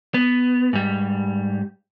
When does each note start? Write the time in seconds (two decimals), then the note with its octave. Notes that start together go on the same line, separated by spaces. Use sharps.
0.14 B3
0.73 G#2 G3